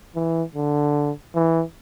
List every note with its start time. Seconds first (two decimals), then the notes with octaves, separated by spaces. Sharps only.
0.15 E3
0.55 D3
1.35 E3